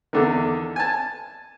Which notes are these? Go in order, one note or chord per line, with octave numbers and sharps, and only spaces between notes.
E2 D3 D#3
G#5 A5